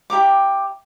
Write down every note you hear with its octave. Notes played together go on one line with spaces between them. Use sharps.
E4 G4 A#5 D6